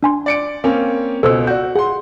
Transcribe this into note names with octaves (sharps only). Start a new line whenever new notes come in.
D4 G#5 C6
D5 C#7 D7
A#3 C4 C#4
C#2 B2 A4 C5 E6
F#4 D5 G6
G#4 F#5 C6